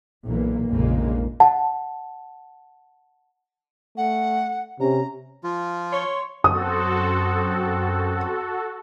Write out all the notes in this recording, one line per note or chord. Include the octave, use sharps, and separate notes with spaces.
B1 A#2 E3 A#3
F1 A#1 F2 C#3 G#3 A#3
F#5 A5
A3 F#5
C3 C#4 A#5
F3 F4
C#5 C6
F#2 C4 F#4 A4 D#6